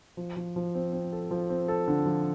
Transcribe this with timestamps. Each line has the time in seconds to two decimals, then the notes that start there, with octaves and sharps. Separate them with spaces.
0.17 F3
0.36 F3
0.56 F3
0.75 C4
0.93 C4
1.12 A4
1.31 F3
1.49 C4
1.68 A4
1.88 D3
2.06 F3